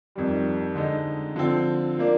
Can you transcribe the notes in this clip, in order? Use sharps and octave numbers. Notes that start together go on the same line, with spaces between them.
F2 D#3 G3
D3 G#3 D#4
D3 F3 C4
F3 A#3 D4